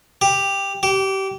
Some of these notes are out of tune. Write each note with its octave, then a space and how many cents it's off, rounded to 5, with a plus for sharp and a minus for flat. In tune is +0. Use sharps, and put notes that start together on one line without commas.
G4 +10
G4 -25